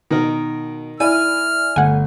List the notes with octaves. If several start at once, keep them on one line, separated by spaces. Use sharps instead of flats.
B2 D#3 A#4
E4 D5 G#5 F6 D#7
G1 A3 F#5 G#5